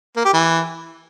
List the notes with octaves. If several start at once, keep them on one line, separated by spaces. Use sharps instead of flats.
A#3
G4
E3